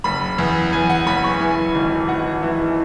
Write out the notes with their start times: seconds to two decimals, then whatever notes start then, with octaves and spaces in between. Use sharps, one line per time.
0.04 F#1 B5
0.38 E2
0.73 E2 G#5
0.90 F#5
1.06 F#1 B5
1.24 C#6
1.41 E3 G#5
1.75 G#1
2.09 G#1 F#5
2.43 E3